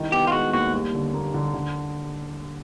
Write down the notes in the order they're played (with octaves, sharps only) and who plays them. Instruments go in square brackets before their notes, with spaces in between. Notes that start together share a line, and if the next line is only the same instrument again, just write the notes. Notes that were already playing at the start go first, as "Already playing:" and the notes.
Already playing: [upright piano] C2 D#3
[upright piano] B3 [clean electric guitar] G4
[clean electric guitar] F4
[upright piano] G#3 [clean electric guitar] F#4
[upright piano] D#2 [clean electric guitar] F#4
[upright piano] G3
D3
A#3
D3
D3